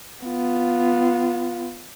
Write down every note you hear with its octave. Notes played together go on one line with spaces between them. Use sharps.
B3 F4